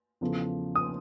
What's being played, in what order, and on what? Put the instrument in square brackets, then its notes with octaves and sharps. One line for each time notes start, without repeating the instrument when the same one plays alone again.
[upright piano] E2 C#3 F3 A3
[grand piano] D#6